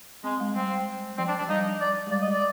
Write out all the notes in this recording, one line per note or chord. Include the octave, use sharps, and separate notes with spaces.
G#3 C4
G#3
G3 C4
F3 C4
D4
F3 D4
G3 D#4
D5
G#3
G3 D5
D#5
G#3 D5